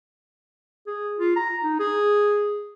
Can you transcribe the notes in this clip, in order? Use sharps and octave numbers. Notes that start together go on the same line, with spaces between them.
G#4
F4
A#5
D#4
G#4